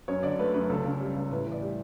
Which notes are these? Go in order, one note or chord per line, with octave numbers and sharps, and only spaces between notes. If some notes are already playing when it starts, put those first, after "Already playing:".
F#2 C#5
D3 D5
A3 B4
F#2 B4
C#2 A4
C#3
G3
C#2
A2 B4
E3
D5
G3